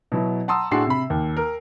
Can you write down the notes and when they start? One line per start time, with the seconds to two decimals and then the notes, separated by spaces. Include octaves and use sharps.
0.12 B2 F#3 E4
0.48 F#5 A5 A#5 C6 D#6 E6
0.71 A2 D4 F#4 G#4 C6 C7
0.87 C3 B5
1.10 D#2
1.37 A#4